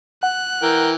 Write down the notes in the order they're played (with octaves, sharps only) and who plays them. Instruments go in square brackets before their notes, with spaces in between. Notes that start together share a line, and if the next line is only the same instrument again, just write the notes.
[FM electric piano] F#5 [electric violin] F#6
[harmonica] E3 G5 [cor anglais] A#4